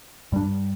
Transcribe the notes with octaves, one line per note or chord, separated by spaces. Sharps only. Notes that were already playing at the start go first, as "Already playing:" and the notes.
G2 G3 D4